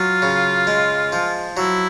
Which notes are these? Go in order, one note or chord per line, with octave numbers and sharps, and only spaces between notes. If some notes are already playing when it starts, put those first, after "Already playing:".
Already playing: F#3 F4
C#3
G#3
F3
F#3 E4